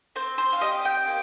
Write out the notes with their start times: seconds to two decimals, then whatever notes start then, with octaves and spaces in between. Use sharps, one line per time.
0.16 C4 C5
0.38 C5
0.53 F5
0.61 G4 D#5
0.85 G5
1.07 A#3